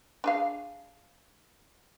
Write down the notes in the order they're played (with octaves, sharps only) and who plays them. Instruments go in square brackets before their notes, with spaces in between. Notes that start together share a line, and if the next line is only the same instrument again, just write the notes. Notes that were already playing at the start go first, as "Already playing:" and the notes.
[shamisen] D4 G#4 F5